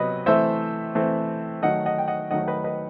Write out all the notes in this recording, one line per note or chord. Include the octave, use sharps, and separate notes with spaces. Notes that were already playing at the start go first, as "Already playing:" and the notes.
Already playing: C3 F#3 B3 B4 D#5
E3 A3 C4 C5 E5
E3 A3 C4
D#3 F#3 A3 D#5 F#5
D#5 F#5
G5
D#5 F#5
D#3 F#3 A3 D#5 F#5
B4 D#5
B4 D#5